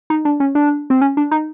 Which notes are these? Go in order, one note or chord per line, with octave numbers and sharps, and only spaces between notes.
D#4
D4
C#4
D4
C4
C#4
D4
D#4